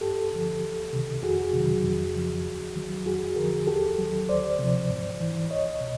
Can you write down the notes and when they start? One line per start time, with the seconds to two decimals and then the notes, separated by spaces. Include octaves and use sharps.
0.01 G2 G4 A4
0.32 D3 F3
0.62 C#2
0.93 C3 D#3
1.23 F2 F#4 G#4
1.53 C3 D#3 F#3
1.84 F2
2.15 C#3 F3
2.45 D#2
2.75 D#3 F#3
3.06 F2 F#4 G#4
3.36 D3 F3 G#4 A#4
3.67 D#2 G4 A4
3.98 D#3 F#3
4.28 D2 C5 D5
4.59 C3 F3
4.90 G#2
5.20 E3
5.50 C2 C#5 D#5
5.81 B2